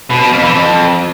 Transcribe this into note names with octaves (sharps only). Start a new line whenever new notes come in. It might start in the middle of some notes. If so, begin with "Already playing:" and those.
B2
B2
F2
E3
F2